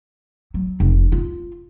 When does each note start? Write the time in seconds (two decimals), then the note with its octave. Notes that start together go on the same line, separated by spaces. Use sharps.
0.54 F#3
0.80 F1
1.12 F4